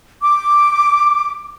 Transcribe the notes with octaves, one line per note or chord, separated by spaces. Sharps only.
D6